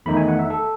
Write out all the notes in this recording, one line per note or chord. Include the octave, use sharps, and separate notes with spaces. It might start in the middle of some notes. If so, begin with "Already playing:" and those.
E2 D#3 A3 D#4 B5
G#5
F#5
E5
A4